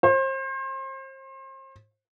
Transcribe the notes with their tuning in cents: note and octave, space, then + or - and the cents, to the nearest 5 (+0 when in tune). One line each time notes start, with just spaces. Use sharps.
C5 +35